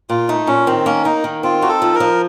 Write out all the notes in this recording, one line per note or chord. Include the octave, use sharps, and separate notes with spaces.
A#2 F4
A3 D#4
A#2 C#4
D#3 C4
A#3 C#4
A#3 D#4
D#3
C4 F4
D#4 F#4
A4
F3
A#4
F3